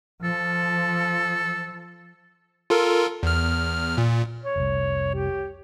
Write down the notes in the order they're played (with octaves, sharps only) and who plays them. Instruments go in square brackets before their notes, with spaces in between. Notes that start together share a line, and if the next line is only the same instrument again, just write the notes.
[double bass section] F3 [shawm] A4
[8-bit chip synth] F4 A4 A#4
E2 F6
A#2
[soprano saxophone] C#5
[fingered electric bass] F1 C2
[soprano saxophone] G4